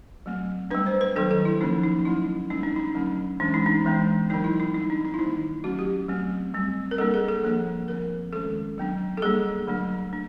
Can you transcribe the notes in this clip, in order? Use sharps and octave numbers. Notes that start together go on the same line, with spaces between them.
F#3 A3 C4
G3 B3 D4 B4
C5
B4
D#3 F#3 B3 D4 A4
A4
E4
D3 F3 A#3 C#4 D#4
D#4
D#4
F#3 A3 C#4 E4
D3 G3 A#3 C#4 D#4
D4
D#4
D3 F#3 A3 C#4
E3 G#3 C#4 D4
D#4
D4
E3 G#3 B3 D4
D3 F#3 B3 D4 D#4
E4
D#4
G3 C4 D#4
D4
D#4
E4
D#3 G3 A#3 D#4
F#3 A3 C#4 F#4
G4
F#3 A3 C4
G3 C4
A#4
G3 A#3 D4 A4
G#4
A4
F3 A#3 D4 A4
D3 F3 A3 C4 A#4
D#3 G#3 C#4 A4
F#3 B3 D4
A4
G3 A#3 D4 G#4
D3 F#3 A3 D4
D4